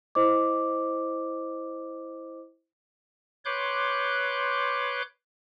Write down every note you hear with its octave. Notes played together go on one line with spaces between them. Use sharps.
E4 C5 D#5 D6
B4 C#5 C6 D6 F#6 G6